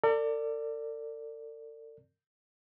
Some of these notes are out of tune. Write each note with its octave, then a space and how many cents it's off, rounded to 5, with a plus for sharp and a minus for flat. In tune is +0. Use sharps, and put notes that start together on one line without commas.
A4 +45 D5 +0